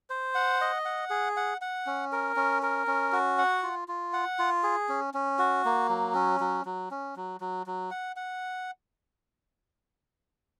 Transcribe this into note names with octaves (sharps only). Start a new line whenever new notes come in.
C5
F#5
D#5
F#5
G#4
F#5
F#5
C#4
A#4
C#4
A#4
C#4
F#4
F#5
F4
F4
F#5
F4
G#4
C#4
C#4
F#4
A#3
F#3
C#4
F#3
F#3
C#4
F#3
F#3
F#3
F#5
F#5